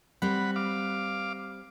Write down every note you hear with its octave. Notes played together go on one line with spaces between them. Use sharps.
G3 C4 F#5 B5
F5 D6